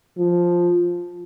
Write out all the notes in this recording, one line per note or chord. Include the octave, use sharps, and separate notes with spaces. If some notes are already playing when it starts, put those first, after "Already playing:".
F3